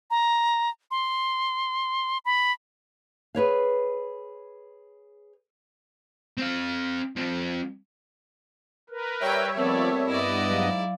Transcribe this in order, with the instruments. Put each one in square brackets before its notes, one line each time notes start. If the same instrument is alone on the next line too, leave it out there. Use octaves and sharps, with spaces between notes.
[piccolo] A#5
C6
B5
[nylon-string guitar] G#4 B4 C#5 F5
[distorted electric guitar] C4 F5
F3 C4
[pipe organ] A#4 B4
[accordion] G3 C#5 E5 [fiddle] G5
[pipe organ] F3 D5 [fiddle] A3 B3 [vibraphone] C4 A#4
[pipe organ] G2 B3 D#5 [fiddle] E4 D5
[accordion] G#2 [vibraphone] F#3 F5